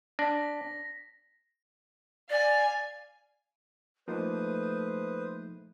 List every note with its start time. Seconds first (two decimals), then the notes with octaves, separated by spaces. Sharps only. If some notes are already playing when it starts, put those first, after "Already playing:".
0.19 D4 A#6 B6
2.30 D5 F5 G#5
4.08 F3 A3 A#3 D#4 B4 C5 D#6